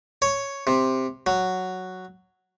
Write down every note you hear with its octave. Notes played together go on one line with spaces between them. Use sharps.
C#5
C3
F#3